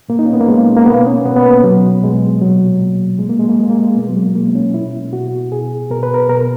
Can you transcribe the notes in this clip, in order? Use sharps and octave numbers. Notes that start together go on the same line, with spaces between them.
A#2 A#3
D#4
C#4
B3
A#3
A#2 G#3
A#3
B2 B3
C#4
B2 B3
B3
A#3
B2 F#3
B2 G#3
A#2 F#3
A#2
A#2 G#3
A#3
G#3
A#3
A#2 G#3
A#3
G#3
B2 B3
F#3
G#3
B2 A#3
C#4
B2 E4
B2 F#4
B2 G#4
B2 A#4
B4
A#4
B2 A#4